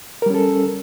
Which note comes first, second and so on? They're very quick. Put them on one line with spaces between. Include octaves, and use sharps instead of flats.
A#4 G3 C#4 A4